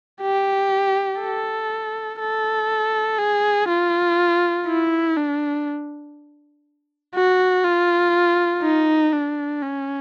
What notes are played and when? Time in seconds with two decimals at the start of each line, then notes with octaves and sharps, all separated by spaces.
0.22 G4
1.20 A4
2.20 A4
3.19 G#4
3.69 F4
4.67 E4
5.17 D4
7.15 F#4
7.64 F4
8.62 D#4
9.13 D4
9.62 C#4